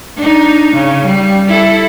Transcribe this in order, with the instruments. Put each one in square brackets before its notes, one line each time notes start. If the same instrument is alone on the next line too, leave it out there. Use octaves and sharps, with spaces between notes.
[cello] D4 D#4
C#3
G3
E4 A4